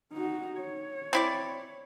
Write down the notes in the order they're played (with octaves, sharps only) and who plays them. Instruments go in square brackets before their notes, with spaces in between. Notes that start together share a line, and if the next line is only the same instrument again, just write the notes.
[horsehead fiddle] D#4 F#4
C#5
[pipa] C4 E4 D5